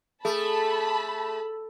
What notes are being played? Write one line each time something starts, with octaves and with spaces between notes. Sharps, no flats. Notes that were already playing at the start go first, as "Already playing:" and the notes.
A3 G#4 A5 B5